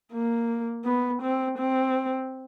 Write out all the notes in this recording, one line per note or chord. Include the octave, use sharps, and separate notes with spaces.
A#3
B3
C4
C4